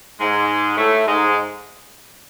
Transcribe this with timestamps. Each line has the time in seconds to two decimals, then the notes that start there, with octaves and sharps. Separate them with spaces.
0.19 G#2 G#3
0.78 A2 A3
1.07 G#2 G#3